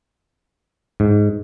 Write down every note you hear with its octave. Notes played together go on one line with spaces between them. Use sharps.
G#2